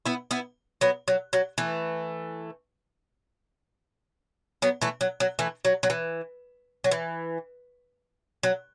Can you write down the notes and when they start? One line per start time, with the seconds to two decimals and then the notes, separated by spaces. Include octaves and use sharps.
0.06 B3 E4
0.31 B3 E4
0.81 F#3 B3
1.08 F#3
1.33 F#3
1.58 E3 A3
4.62 F#3 B3
4.82 E3 A3
5.01 F#3
5.20 F#3
5.39 E3 A3
5.65 F#3
5.83 F#3
5.90 E3
6.84 F#3
6.91 E3
8.43 F#3